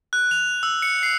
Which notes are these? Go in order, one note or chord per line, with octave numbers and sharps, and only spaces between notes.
F#6
F7
E6
C#7
C7